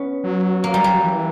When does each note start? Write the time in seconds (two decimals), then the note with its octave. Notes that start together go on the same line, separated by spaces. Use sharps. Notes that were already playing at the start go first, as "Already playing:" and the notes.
Already playing: B3 C#4
0.24 F#3
0.64 A#3
0.74 G3
0.84 G3
0.94 F#3
1.04 E3